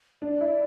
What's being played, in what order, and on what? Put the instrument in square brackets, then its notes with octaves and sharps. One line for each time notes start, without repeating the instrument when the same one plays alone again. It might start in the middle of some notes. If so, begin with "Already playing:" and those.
[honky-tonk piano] D4 [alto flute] D5
[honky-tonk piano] E4